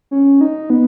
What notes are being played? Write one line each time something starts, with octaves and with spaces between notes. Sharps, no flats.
C#4
D#4
B3